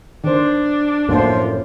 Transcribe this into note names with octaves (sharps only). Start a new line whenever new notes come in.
D#3 D4 C5
F#2 A2 F3 A3 A#3 F4 C5